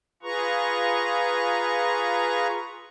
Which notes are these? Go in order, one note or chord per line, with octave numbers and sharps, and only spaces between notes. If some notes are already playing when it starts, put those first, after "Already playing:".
F4 G#4 B4 A#5 C#6